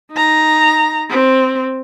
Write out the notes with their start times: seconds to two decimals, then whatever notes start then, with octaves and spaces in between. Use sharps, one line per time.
0.12 D#4 A#5
1.10 C4